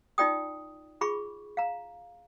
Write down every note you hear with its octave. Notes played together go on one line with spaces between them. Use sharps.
D#4 F4 D5 G5 D#6
F4 G#4 B5 C#6
F5 A#5